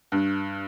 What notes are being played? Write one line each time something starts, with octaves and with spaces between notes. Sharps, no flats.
G2